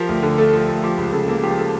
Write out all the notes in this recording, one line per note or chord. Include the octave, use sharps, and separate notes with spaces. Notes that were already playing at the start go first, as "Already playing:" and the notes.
Already playing: F3 G4 A#4
D2
D3
A3 A4
F3
D2
F3 G4
C#2
C#3 A4
A#3 A4
F3 G4
A4